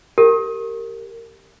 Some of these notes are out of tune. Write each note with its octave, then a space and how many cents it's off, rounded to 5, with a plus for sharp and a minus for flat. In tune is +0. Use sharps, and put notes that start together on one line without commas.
G4 +0 A#4 -20